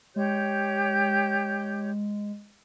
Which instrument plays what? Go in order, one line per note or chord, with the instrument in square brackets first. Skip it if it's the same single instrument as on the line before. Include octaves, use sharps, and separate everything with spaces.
[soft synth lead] G#3 [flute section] G4 C#5 G6